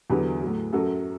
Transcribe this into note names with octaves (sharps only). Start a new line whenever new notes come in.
E2 D3 F#3 G4 B4
A2 F#3
F#2 F#3 F#4 A4